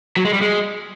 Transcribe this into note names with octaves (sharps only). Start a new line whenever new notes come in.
F#3
G#3
G3
G#3